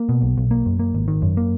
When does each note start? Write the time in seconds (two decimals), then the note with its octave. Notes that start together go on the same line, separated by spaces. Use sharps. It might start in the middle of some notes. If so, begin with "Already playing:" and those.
Already playing: A#3
0.09 B2
0.22 B1
0.37 B1
0.51 A#3
0.66 F#2
0.79 A#3
0.94 G#1
1.08 D#3
1.22 F#2
1.37 A#3